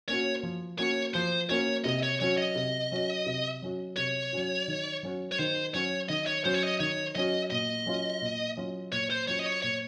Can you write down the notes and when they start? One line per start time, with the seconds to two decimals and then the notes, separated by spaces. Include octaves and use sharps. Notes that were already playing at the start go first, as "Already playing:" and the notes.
0.08 A#3 C#4 F#4 C#5
0.43 F3
0.79 A#3 C#4 F#4 C#5
1.14 F3 C5
1.50 A#3 C#4 F#4 C#5
1.84 C3 D#5
2.03 C#5
2.20 F#3 C#4 F#4 C#5
2.38 D#5
2.55 C3
2.92 F#3 C#4 F#4
3.26 C3
3.62 F#3 C#4 F#4
3.97 C3 C#5
4.33 F#3 C#4 F#4
4.68 D#3
5.03 F#3 C#4 F#4
5.32 C#5
5.38 D#3 C5
5.74 F#3 C#4 F#4 C#5
6.09 D#3 D#5
6.27 C#5
6.45 F#3 C#4 F#4 C5
6.54 C#5
6.63 D#5
6.80 D#3 C#5
7.15 F#3 C#4 F#4 D#5
7.51 A#2 D#5
7.86 F#3 C#4 F4
8.21 A#2
8.57 F#3 C#4 F4
8.92 A#2 C#5
9.10 C5
9.28 F#3 C#4 F4 C#5
9.39 D#5
9.46 C#5
9.62 A#2 C#5